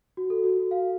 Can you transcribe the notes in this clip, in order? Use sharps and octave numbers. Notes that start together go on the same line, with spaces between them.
F#4
A4
F#4
F#4
F5